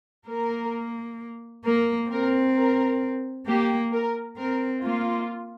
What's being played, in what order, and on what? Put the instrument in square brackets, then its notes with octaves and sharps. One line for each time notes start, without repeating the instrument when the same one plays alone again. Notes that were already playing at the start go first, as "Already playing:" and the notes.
[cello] A#3 [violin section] A#4
[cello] A#3 [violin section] A#4
[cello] C4 [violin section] A#4
[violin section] A#4
[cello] A#3 [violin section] G4
[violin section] A#4
[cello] C4 [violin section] A#4
[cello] A#3 [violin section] F4